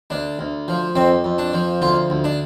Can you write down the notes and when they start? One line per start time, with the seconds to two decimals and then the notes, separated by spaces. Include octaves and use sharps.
0.10 D2 D4
0.39 D2
0.68 F3
0.96 F2 C4
1.24 F2
1.38 D4
1.53 F3
1.82 D2 F4
2.10 D2
2.24 D4